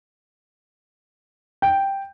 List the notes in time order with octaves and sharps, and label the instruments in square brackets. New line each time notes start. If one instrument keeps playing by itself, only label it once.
[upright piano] G5